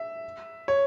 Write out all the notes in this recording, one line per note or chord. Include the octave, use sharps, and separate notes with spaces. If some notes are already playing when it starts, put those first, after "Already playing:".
Already playing: E5
C#5